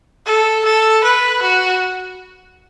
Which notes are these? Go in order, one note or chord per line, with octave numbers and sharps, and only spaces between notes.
A4
A4
B4
F#4